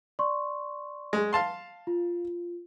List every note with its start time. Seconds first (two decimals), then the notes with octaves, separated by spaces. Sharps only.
0.19 D5 C6 C#6
1.13 G#3
1.33 F5 A5 C6
1.87 F4